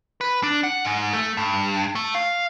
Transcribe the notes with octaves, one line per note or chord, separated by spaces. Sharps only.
B4
D4
F#5
G#2
A3
G2
A3
F5